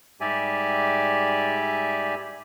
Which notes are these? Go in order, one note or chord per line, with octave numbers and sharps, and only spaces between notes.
G#2 G3 G4 D5 E5 G#5